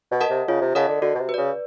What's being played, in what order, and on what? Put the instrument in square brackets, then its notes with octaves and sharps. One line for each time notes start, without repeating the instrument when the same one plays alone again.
[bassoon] B2
[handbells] A#4 D#5 F#5 A5
[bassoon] C3
[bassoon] C#3 [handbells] F4
[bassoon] C3
[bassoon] C#3 [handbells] A#4 D#5 F#5 A5
[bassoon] D3
[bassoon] D3 [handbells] F#4
[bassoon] B2
C3
[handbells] B4
[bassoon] C#3 [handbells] D5